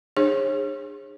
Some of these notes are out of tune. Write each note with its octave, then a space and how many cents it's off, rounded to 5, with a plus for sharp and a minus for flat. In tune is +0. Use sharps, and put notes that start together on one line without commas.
D4 +45 G#4 -25 C#5 -40